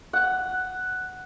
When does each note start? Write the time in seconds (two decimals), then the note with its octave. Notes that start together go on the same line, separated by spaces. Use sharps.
0.13 F#5